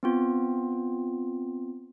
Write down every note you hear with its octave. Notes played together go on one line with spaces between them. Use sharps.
B3 C4 F4